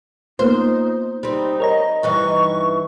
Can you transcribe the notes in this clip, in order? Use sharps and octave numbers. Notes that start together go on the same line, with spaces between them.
A#3 B3 D#4 F4 C5
G3 C4 D#4
A#4 C#5 D#5 A#5
G2 E3 D#4 C#6